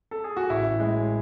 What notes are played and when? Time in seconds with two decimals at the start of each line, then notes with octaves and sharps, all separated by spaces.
0.11 A4
0.24 G#4
0.37 F#4
0.50 A1 E4
0.78 A2 G#3